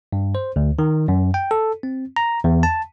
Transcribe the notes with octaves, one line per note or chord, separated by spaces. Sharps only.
G2
C5
D2
D#3
F#2
G5
A4
C4
A#5
E2
A5